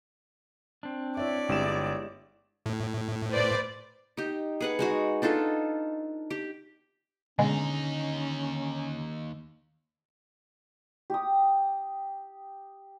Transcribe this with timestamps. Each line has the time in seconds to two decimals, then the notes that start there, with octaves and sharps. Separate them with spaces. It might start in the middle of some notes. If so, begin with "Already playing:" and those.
0.83 C4 D4
1.17 E4 C#5 D5 E5
1.49 G1 G#3 E4 G4 E7
2.66 A2
3.29 B4 C5 D5
4.17 D#4 G4
4.60 G#4 B4 F#5
4.79 G#3 D#4 F#4
5.22 D4 D#4 F4 A4
6.31 G4
7.39 D#2 B2 D3 G#3 C#4 D#4
11.10 G4 D#6